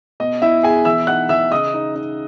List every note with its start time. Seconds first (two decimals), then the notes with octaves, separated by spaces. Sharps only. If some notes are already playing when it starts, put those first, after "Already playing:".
0.20 B2 D#5
0.42 B2 E4 E5
0.63 B2 G#4 G#5
0.85 E3 E5 E6
1.07 D#4 F#5 F#6
1.29 E3 E5 E6
1.51 C#3 D#5 D#6
1.74 D#4
1.95 D#4